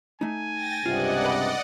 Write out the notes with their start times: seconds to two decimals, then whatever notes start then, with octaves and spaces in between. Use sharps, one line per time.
0.21 A3 D#4 G#5
0.54 G5 A6 A#6
0.86 C#2 G2 C3 F4 D5 D#5 F#5
1.25 B4 B5